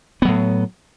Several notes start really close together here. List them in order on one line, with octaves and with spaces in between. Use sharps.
B3 F#3 A2